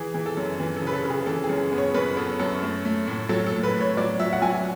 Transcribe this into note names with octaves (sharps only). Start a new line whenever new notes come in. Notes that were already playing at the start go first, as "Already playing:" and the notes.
Already playing: E3 G#4
E3
A4
F#2
E3
A4
C#3 B4
A4
C#3
G#4
E3 A4
G#4
F#2
B3
C#5
F#2 B4
B3 A4
F#2 A4
A3
A3
A2
F#3 A4
A4
A2
B4
A2
C#5
F#3 D5
F#3 E5
F#5
F#3 G#5